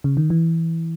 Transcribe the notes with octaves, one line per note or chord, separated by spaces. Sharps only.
C#3
D#3
E3